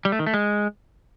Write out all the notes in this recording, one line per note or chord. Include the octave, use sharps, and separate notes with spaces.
G3
A3
D#3
A3
G#3